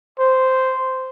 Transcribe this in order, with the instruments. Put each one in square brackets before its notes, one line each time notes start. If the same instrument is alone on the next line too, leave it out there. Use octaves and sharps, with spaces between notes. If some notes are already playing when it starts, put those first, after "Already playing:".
[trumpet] C5